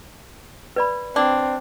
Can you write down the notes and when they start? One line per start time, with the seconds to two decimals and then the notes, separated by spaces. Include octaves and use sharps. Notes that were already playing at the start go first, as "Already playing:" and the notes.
0.76 B4 D5 B5
1.16 C4 D4 D5